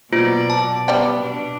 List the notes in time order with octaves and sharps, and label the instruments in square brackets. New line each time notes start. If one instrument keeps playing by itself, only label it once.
[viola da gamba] B2 F#3 D5 [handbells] A#3 F4 C5
[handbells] A5
[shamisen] G3 D5 G5 [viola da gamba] B3
[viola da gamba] B2 D4